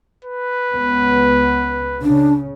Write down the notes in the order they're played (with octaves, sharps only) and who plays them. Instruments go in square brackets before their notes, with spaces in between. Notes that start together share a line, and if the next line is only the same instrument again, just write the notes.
[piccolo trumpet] B4
[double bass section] C#2 B3
[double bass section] C#3 [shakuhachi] D4